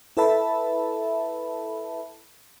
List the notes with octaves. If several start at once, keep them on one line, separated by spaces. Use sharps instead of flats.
E4 A4 B4 E5 A5 B5